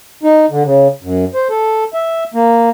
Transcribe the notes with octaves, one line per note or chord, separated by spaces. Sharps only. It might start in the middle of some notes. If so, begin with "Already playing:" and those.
D#4
D3
C#3
F#2
C5
A4
E5
A#3